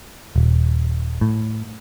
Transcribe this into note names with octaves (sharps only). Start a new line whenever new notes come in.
D#1
A2